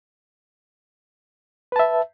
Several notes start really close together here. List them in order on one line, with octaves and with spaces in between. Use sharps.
B4 A5 E5